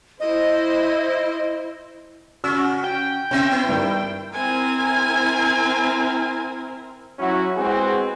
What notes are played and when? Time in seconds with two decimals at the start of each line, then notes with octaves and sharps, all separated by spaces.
0.20 E4 C5 D#5
2.44 C#3 C#4 F#4 E6
2.84 G5
3.31 C3 C4 C#4 E5
3.51 B3 E4
3.69 G2 D#3
4.33 C4 E4 A#4 G#5
7.19 F#3 C#4 E4 F#4
7.57 G#3 B3 C4 E4 F#4 G#4